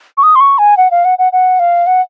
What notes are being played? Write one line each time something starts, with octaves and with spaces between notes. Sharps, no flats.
C#6
D#6
C6
C#6
G#5
F#5
F5
F#5
F#5
F#5
F5
F#5